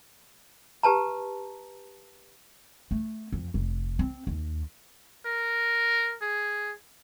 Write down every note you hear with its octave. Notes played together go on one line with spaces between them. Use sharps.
G4 B4 A5 A#5
A3
F2
F1
C4
D#2
A#4
G#4